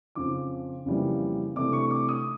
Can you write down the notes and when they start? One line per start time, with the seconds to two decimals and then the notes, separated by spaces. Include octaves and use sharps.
0.15 F2 C#3 F3 D6
0.86 F2 C#3 E3 G3 A#3
1.56 C3 E3 A3 D4 D6
1.73 C#6
1.91 D6
2.09 D#6